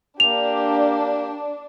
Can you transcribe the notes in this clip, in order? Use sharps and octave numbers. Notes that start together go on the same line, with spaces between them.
A#3 D4 G4 F7